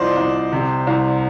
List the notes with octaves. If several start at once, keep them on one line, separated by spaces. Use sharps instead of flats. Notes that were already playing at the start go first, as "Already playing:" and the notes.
Already playing: C2 F3 F4 C5 D5 D#5
C2
C3
C2